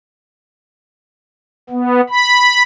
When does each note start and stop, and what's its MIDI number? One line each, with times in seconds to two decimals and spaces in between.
1.70 2.01 59
2.09 2.63 83